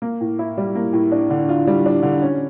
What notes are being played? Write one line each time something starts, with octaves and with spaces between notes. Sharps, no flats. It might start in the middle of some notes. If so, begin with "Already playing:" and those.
A#3
A2
E4
G3
A#3
A2
D4
D3
F4
G3
D4
D3
C#4